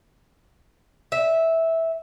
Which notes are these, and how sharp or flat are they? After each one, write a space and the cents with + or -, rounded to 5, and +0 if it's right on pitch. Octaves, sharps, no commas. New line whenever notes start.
E5 -10